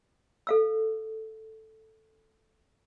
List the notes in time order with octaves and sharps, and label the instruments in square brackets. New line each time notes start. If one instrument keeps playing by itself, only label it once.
[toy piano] A4 F5 E6